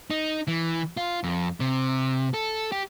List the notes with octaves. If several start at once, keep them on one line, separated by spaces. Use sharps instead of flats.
D#4
E3
F4
F2
C3
A4
G4